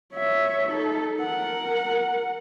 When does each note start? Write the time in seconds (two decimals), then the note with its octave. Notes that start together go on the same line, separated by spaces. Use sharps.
0.13 C#5 E5
0.68 D#4 A4
1.20 A#4 F#5